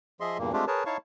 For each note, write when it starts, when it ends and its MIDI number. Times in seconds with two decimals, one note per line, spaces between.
0.20 0.38 53
0.20 0.38 68
0.20 0.38 75
0.20 0.38 76
0.20 0.38 84
0.38 0.52 40
0.38 0.52 43
0.38 0.52 46
0.38 0.52 58
0.53 0.65 56
0.53 0.65 57
0.53 0.65 60
0.53 0.65 62
0.53 0.65 65
0.53 0.65 67
0.67 0.84 68
0.67 0.84 70
0.67 0.84 71
0.67 0.84 73
0.67 0.84 81
0.86 0.97 63
0.86 0.97 64
0.86 0.97 73
0.86 0.97 77
0.86 0.97 81
0.86 0.97 85